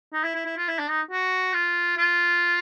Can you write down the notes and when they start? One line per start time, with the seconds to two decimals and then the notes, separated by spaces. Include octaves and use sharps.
0.13 D#4
0.24 E4
0.35 E4
0.45 E4
0.57 F4
0.68 E4
0.79 D4
0.89 D#4
1.11 F#4
1.54 F4
1.97 F4